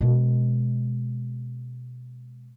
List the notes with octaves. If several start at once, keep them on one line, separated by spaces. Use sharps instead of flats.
B2 G#3